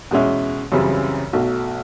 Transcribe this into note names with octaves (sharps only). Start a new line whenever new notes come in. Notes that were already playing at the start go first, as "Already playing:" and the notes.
E2 B2 G#3 C#4 E4
F#2 C#3 E3 G3 C4
B1 B2 F#3 A3